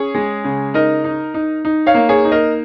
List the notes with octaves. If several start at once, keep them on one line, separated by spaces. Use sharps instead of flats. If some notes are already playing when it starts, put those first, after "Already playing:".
Already playing: C#4 G#4 C#5
G#3
C#3
D#4 A#4 D#5
D#4
D#4
D#4
C#5 F5
A#3
G#4 C#5
D#4
A#4 D#5